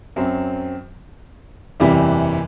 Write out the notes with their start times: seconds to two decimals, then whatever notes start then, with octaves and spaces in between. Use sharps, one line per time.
0.16 F#2 F#3 C4
1.80 F#1 E2 C3 E3 G3